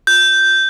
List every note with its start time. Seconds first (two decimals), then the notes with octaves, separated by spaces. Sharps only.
0.07 G6